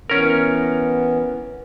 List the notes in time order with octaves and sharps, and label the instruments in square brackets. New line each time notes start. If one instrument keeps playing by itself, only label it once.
[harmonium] E3 B3 [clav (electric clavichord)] C#4 A#4